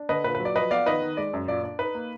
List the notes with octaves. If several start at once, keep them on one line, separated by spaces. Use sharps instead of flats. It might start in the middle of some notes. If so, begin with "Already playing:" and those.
Already playing: D4
D3 B4 D#5
A#2 B4
B4
F#3
D5
F3 B4 D#5
B3 D5 F5
D#3 B4 D#5
D#3
G#3 D5
F#2
A#2 D5
D4 D5
D#4 B4
A#3